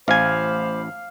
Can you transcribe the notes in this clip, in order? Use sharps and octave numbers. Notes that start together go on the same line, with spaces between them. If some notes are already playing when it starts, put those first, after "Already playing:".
A1 C5 F5 G#5 B5 D6